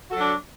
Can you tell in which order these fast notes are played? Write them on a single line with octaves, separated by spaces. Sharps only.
F#4 A4 F#3 D4